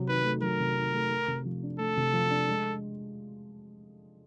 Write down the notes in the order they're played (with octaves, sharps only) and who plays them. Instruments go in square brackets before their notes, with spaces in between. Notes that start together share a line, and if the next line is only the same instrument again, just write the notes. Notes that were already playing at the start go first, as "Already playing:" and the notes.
Already playing: [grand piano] C3 F#3
[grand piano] D#3 [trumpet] B4
[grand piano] A3
[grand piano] F#3 [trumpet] A#4
[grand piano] C3
D#3
A3
A3
C3
F3
D4
[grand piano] A3 [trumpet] A4
[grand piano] C3
F3
D4
G#3